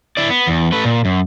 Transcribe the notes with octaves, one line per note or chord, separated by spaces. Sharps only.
E4 D5
B3
E2
A3 B4
A#2
F#2